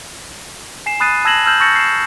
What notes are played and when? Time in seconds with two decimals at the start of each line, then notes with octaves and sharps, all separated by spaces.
0.86 G#5 C7 E7
1.00 B5 D#6 F#6 A6 C7 D#7
1.25 A5 E6 G#6 A#6 E7 F#7
1.46 E6 F6 G6 E7 F#7
1.60 C#6 E6 G6 A6 A#6 C#7
1.76 C7 E7